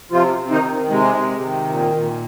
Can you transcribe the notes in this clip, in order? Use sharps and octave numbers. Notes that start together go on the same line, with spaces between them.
C3 F3 F4
C3
D#3 D#4
D#3
C3 G#3
C3
D#3
A#2
A#2